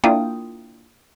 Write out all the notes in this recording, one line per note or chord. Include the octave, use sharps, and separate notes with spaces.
A#3 D4 E4 F4 G5 D#6